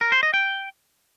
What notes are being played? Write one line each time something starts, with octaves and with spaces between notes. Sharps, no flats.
A#4
C5
D#5
G5